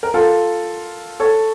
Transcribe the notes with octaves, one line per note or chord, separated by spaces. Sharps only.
A#4
F4 A4
A4 C#5